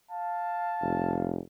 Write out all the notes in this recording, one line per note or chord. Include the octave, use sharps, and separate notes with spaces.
F5 A5
F1